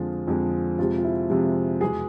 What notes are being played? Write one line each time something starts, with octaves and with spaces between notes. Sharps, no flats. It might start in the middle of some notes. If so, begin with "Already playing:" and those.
Already playing: F2 D3 F3 G#3 F4
F2 D3 F3 G#3
F2 C3 F3 G#3 F4
F4
E4
F2 C3 F3 G#3 F4
E2 B2 G#3 G#4